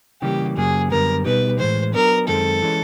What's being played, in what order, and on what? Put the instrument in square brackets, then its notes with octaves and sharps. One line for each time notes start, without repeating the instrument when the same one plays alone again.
[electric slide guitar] C#3 E3 G3 A#3 [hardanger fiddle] G4
[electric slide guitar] F#2 C#3 F#3 A#3 [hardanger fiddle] G#4
[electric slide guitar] F#2 D3 G3 B3 [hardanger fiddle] A#4
[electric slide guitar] B2 G3 B3 D#4 G4 [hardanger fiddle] B4
[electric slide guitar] A2 E3 G#3 [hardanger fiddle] C5
[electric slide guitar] F#3 B3 D4 [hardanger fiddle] A#4
[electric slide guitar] F#2 D#3 G#3 C4 [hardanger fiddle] A4
[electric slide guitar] E3 G#3 C#4